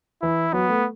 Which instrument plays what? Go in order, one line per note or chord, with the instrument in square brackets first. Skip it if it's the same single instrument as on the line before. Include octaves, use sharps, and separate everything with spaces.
[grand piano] E3 [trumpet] E4
[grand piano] F#3 [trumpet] B3
[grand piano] A3